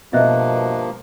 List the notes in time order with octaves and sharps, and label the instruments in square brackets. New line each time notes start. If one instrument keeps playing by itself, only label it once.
[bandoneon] G2 F3 A#3 [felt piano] B2 [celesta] D#5 E5 F#6